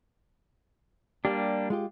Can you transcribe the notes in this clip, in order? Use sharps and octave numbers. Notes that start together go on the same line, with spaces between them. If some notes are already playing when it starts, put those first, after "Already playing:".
G3 A#3 D4 G4
G#3 F4 G4